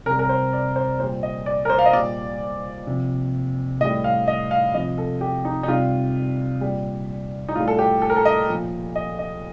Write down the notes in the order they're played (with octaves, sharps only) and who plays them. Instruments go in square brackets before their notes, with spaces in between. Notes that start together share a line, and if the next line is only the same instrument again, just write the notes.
[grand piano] C3 A#4
G3
A#4
C5
D5
C5
A#2 C5
G3
D#5
D5
A#4
C5
F5
D#5
A#2 G3 D5
C3 F3
A2 D#5
G3
F5
D#5
F5
C3 F3 D#5
A4
G4
D#4
D#4
C3 G3 F4
A#2 G3
D#4
A2 G3 F4
A4
G4
A4
A#4
A4
D#5
A#2 F3
D#5
D#5